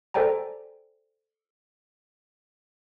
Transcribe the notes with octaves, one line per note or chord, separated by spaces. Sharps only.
A4 C5 D5 G5 G#5 A#5